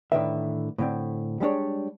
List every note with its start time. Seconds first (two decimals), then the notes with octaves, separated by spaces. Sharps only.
0.12 A2 D3 D#3 G#3 B4 E5
0.78 A2 D3 C4
1.40 G3 G#3 D4 C#5